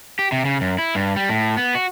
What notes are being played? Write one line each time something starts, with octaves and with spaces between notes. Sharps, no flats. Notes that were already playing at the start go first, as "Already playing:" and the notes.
G4
C3
C#3
F#2
E4
G2
G3
A2
B3
F#4